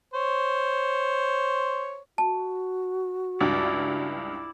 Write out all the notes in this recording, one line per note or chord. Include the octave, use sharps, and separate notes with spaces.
C5 C#5
F#4 A5
C#2 G2 E4 D5